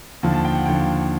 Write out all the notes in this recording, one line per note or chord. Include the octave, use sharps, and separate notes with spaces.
D#2 D3 F3 A5
A5
G5
F#5
D#2 D3 F3 G5